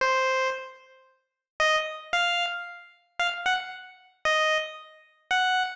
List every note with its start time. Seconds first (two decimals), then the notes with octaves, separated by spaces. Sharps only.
0.01 C5
1.60 D#5
2.13 F5
3.19 F5
3.46 F#5
4.25 D#5
5.31 F#5